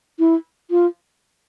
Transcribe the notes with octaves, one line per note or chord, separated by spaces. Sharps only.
E4
F4